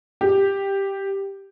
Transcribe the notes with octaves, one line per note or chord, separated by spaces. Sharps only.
G4